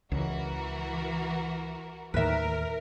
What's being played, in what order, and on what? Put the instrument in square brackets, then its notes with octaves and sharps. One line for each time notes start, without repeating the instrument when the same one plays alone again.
[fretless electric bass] C#2 [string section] E3 F#4 A#4
[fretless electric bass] D#2 A2 D#3 [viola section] A#4 [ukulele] B4 E5